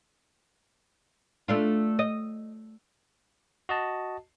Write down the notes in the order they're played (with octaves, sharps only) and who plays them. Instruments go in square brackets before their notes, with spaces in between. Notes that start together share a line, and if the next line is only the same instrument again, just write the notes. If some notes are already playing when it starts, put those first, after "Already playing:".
[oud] A3 D4 F4
D#5
[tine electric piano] F#4 D#5 A5